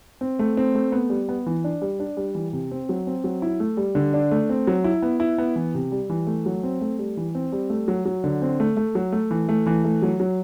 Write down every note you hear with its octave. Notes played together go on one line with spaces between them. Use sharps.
C4
A3
C4
A3
B3
G3
B3
E3
D4
G3
D4
G3
E3
C3
C4
F#3
C4
F#3
E4
A3
G3
D3
D4
A3
C4
F#3
E4
B3
E4
B3
E3
C3
G3
E3
A3
F#3
C4
A3
G3
E3
C4
G3
A3
F#3
F#3
D3
C4
A3
A3
F#3
A3
E3
A3
E3
A3
F#3
F#3